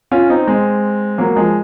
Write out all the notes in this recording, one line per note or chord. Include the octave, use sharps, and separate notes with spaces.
C#4 F4
C4 D#4
G#3 C4
F#3 A#3
F3 G#3